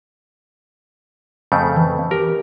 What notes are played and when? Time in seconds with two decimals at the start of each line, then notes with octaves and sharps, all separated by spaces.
1.52 F2 C#3 A3 G6
1.76 E3
2.11 G4 A#4